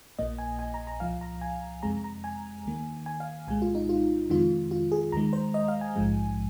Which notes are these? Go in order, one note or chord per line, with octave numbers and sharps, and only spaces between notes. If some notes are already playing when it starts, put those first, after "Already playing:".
A#1 A#2 A#3 D#5
G#5
G#5
A#5
A#5
C2 A#2 F3 F5
A#5
G#5
F2 C3 G#3 A#5
A#5
G#5
D#2 D#3 A#3
G#5
F5
C2 A#2 G#3 G#5
F4
D#4
F4
F2 C3 D#3 G#3 F4
F4
G#4
D#2 D#3 G#3 A#5
C5
D#5
F5
G#5
A#1 G#2 F3 G#3